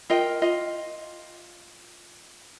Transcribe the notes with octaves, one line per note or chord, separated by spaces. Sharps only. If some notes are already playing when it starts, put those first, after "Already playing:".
F4 A#4 D#5 G5
F4 D#5